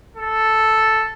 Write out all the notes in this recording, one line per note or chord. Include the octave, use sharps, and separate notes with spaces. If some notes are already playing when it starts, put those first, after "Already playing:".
A4